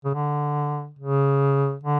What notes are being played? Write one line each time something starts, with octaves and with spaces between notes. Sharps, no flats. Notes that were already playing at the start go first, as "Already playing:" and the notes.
C#3
D3
C#3
D3